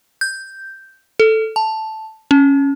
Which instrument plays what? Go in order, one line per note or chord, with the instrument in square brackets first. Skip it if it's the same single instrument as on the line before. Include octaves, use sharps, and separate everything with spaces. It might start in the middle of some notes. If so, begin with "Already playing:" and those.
[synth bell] G6
A4
A5
C#4